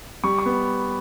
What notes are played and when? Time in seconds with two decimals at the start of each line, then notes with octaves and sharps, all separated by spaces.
0.24 G3 C#6
0.39 C#6
0.46 B3